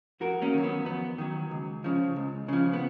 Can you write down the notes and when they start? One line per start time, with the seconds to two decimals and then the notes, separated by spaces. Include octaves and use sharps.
0.20 F2 F#4 A#4
0.42 A#3 C#4
0.54 D#3 F#3
0.64 B3
0.85 F2 B3
1.18 D#3 F#3
1.51 C#2
1.84 C#3 F3
2.16 C#2
2.48 C#3 F3
2.73 B3